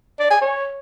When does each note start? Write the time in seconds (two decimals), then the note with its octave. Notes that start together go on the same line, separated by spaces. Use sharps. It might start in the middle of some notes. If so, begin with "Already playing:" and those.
0.19 D5
0.30 G#5
0.41 C#5